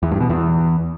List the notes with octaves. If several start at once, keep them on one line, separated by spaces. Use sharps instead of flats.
E2
G2
B2
E2